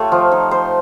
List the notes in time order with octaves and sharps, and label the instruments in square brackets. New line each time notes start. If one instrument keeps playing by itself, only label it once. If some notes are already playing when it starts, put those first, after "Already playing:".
Already playing: [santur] A3 F4 G4 C#5
F3
D#4
C5